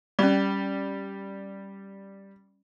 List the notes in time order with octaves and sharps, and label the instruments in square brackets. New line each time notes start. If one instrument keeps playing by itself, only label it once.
[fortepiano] G3 [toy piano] C#4 D5